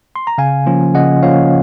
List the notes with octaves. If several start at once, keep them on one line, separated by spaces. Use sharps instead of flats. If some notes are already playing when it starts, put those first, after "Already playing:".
C6
A#5
C#3 F5 G#5
F3 A#3 C#4 F4
C#3 D#5 F#5
F3 A#3 C#4 F4 C#5 F5